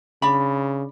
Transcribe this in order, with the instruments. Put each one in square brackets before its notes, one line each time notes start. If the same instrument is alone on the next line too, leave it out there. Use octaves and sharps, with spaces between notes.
[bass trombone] C#3 [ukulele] D4 B5